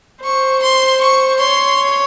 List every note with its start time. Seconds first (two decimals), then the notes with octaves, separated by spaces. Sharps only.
0.24 C5 C#6
0.63 C6
1.01 C#6
1.40 C#5 C6